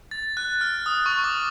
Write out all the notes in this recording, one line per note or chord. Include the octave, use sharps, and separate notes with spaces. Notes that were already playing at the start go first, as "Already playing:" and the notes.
A6
F#6
F6
D#6
C#6
D6